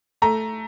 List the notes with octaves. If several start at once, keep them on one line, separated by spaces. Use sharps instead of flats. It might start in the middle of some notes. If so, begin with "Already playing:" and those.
A3 A#5